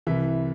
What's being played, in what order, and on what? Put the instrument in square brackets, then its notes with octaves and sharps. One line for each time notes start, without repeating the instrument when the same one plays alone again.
[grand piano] C2 C3 E3 E5